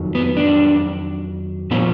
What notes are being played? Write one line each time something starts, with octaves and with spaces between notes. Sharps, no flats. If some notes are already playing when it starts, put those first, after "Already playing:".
Already playing: F2 D#3 F#3
B3
D4
A#2 F3 B3